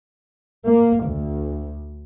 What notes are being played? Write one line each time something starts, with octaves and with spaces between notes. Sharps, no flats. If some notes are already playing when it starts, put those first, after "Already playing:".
A#3
D2